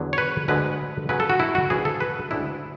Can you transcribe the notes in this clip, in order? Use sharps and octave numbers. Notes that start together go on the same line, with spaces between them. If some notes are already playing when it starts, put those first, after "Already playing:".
Already playing: E2 D3 F#3 B3
C#5
B4
D2 D3 G#3 B4
C#3 F#3 C#4 B4
A4
F#4
E4
F#4
D2 C#3 E3 G#4
A4
B4
D2 C#3 G#3 D4 E4